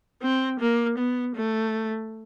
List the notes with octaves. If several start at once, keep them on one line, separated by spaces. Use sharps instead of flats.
C4
A#3
B3
A3